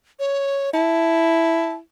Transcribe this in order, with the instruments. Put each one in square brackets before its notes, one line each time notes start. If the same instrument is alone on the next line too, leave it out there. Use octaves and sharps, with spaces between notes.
[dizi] C#5
[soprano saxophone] E4 [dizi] A5